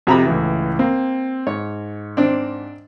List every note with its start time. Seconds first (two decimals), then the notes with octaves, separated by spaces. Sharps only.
0.07 F2 C3 F#4 A#5 B5
0.26 C#2 A2 E3
0.79 A#3 C4
1.47 G#2 C#5
2.17 C4 D4